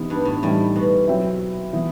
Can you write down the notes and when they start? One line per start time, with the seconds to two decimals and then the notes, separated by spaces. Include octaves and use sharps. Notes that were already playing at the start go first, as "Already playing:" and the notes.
Already playing: C3 E3 B3 D#4
0.10 G2
0.25 A2
0.43 A2 E3 G3 D#4
0.76 B2
1.08 F#3 C4 E4
1.73 E3 B3 E4